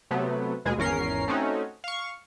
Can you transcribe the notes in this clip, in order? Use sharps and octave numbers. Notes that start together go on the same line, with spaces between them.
C3 F#3 A3 B3
D#2 B2 G#3 G#4
G#1 E2 C#4 A#4 C7
A3 C4 C#4 D#4 F#4
F5 C#6